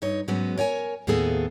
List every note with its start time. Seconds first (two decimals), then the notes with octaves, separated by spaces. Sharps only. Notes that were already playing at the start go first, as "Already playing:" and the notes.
0.02 G2 D#4 C#5
0.28 G#2 F#3 G#3 B3 C#4
0.58 A#4 C#5 G5 G#5
1.07 D#2 A2 A#3 B3 G#4 A4